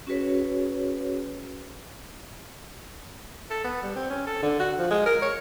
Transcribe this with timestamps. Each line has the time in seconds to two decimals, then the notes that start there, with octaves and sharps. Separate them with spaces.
0.07 C#4 F#4 G#4 B4 C#5
3.51 A4
3.64 B3
3.83 G3
3.95 C4
4.10 C#4
4.26 A4
4.42 D3
4.60 F#4
4.78 F3
4.90 G#3
5.06 A#4
5.22 C#5